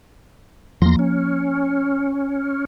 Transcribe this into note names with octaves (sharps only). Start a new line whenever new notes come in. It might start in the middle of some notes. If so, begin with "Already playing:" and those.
E2 F3 A#3 C6 A#6
C#4